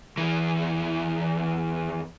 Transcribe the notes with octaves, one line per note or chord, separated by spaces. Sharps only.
E2 E3